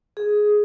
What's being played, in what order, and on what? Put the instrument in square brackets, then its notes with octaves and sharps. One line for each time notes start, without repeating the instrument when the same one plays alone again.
[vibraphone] G#4